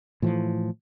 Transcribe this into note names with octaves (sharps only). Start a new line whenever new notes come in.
A2 E3 F3